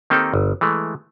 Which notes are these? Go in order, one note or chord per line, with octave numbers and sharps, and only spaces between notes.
D#3 A#3 C4 D#4 G4 A4
G1
E3 G#3 A3